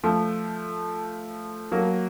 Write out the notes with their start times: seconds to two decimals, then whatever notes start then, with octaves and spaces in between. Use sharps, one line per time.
0.04 F3 A3
1.72 F#3 A#3